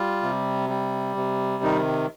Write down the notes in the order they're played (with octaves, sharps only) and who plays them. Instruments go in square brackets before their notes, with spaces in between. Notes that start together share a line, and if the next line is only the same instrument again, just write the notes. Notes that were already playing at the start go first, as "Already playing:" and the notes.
Already playing: [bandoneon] G3 F4
C3
G3
C3
D#3 D#4